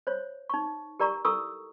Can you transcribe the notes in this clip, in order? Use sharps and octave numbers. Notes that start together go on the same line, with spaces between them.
C5 C#5
D#4 C#6
G4 A#4 D5 A#5 C#6
E4 A4 A#4 C#6 D#6 E6